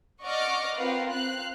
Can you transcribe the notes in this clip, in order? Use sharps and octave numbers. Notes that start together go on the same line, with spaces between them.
D5 D#5 F#5 C#6 D6 F6
C4 F4 A#4 B4 F5 F#5
C4 F5 F#6